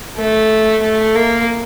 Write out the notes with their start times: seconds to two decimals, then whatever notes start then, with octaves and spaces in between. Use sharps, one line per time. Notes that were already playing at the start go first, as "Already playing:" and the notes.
0.17 A3
0.82 A3
1.15 A#3